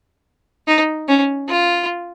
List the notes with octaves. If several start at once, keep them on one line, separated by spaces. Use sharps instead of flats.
D#4
C#4
F4